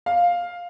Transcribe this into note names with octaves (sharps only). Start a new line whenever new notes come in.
F5